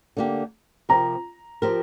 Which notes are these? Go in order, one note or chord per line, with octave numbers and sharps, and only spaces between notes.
D3 A#3 G4
C3 F3 C4 G4 A#4 A#5
F3 C4 G4 A#4